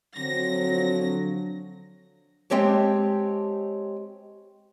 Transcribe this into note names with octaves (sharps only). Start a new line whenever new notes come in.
D3 F3 F#3 C4 A#6
G#3 C4 G4 C#5 A5